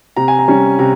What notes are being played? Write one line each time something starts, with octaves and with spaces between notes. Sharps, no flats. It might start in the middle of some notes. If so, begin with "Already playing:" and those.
C3 A#5
G#5
A#5
G3 C#4
C3 A#5